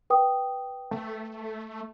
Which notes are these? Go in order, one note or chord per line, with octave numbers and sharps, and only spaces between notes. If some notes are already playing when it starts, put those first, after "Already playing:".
B4 G5 D#6
A3